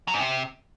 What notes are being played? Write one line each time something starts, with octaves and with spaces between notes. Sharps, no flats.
F#3
G#2
C3